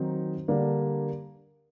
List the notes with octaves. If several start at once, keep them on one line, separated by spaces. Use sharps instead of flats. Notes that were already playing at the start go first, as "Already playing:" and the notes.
Already playing: D#3 F#3 C4 D#4
D3 G3 A#3 D4